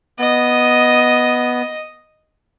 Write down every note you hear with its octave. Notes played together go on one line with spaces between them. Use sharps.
B3 D#5